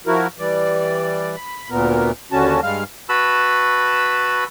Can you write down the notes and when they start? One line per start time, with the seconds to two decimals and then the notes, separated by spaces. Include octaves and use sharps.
0.07 F3 E4 F#4 A#4
0.39 E3 G3 D5
1.36 B5
1.70 D2 A#2 B3 A#4
2.32 D#2 D3 C#4 F#4 A5
2.63 G2 G3 G#3 F5 F6
3.09 F#4 B4 A5 B5 E6